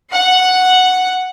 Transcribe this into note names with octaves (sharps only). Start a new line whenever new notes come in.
F#5